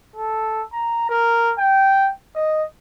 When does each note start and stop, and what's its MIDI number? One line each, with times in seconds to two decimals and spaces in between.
0.16 0.62 69
0.73 1.08 82
1.09 1.53 70
1.58 2.10 79
2.35 2.63 75